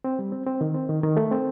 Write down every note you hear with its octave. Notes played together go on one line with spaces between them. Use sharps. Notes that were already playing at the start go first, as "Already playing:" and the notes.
C4
G3
C4
C4
D#3
C4
D#3
D#3
A3
C4